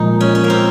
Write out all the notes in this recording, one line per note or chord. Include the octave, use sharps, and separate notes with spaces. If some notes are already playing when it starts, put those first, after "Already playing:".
Already playing: A#2 F3 G#3 D#4
C#4
C#4
A#3
C4